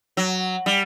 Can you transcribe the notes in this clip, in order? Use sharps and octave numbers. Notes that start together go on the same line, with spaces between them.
F#3
G3